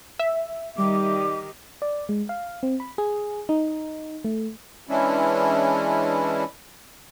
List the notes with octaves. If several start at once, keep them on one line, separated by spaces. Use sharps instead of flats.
E5
D#3 G3 G4 D#5 D6
D5
G#3
F5
C4
B5
G#4
D#4
A3
E3 G#3 C#4 D4 E4